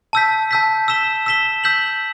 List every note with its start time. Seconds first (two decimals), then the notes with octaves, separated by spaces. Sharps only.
0.13 A5 E6 G6 B6
0.51 A5 E6 G6 B6
0.88 E6 B6 E7 G7
1.26 E6 B6 E7 G7
1.64 E6 G6 B6 F#7